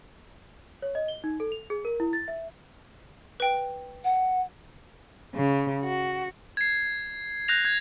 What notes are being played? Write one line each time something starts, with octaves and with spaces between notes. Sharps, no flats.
C#5
D#5
G7
D#4
A4
F7
G#4
A#4
E4
A6
E5
B4 G5
F#5
C#3
F#4
G#6 C7
F#6 G6 A#6 F7
G#6